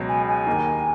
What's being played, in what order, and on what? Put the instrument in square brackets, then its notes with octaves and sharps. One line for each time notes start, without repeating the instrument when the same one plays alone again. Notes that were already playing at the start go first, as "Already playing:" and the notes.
Already playing: [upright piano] C#2 B2 F#3
[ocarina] G#5
G#5
[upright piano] D#2 D#3 A#3 D#4